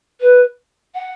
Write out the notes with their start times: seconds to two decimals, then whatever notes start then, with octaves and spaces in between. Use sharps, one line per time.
0.20 B4
0.95 F#5